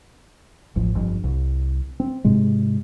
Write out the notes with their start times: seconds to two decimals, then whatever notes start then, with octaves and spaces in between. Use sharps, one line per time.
0.76 A1 F2
0.95 G1 F2
1.24 C2
2.00 C4
2.24 G#2 C3 G#3